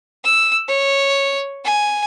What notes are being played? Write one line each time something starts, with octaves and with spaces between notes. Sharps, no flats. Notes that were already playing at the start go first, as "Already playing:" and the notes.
E6
C#5
G#5